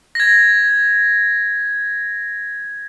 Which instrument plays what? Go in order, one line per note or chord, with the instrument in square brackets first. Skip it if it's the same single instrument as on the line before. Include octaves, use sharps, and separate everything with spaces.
[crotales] G#6 A#6